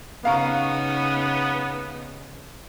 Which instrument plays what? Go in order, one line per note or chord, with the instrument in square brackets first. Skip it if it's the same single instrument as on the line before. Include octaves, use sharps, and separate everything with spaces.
[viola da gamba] C#3 D#4 [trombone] B3 [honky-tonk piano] F5 A#5 C#6